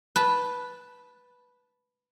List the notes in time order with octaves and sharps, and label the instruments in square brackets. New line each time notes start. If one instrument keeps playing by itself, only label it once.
[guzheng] B4 A5